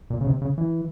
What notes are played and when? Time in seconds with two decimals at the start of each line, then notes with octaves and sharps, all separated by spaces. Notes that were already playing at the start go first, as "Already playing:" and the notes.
0.10 A#2
0.21 C#3
0.27 C3
0.42 C#3
0.58 E3